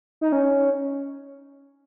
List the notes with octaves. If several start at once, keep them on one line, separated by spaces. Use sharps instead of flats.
D#4
C#4